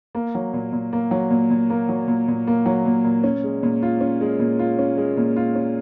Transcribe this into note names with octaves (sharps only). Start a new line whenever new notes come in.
A#3
F#3
A#2
A#2
A#3
F#3
A#2
A#2
A#3
F#3
A#2
A#2
A#3
F#3
A#2
A#2
C#4
G#3
A#2
F4
C#4
G#3
A#2
F4
C#4
G#3
A#2
F4
C#4